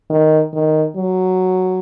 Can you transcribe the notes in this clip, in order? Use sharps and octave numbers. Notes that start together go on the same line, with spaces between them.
D#3
D#3
F#3